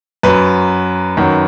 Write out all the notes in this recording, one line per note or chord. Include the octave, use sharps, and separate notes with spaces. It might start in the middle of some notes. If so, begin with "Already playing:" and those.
F#2 F#3 B4
F#2 D#3 F#3